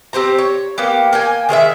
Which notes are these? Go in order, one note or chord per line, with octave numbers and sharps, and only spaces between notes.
C4 G4 C5 A#5
C#5
A#3 B3 G4
A#3 G5 G#5
D#3 G#3 C5 E5